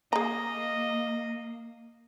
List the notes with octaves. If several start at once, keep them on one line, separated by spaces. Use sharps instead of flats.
A#3 G#4 D#5 A#5